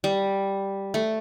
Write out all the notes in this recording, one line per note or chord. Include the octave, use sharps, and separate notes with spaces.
G3
A3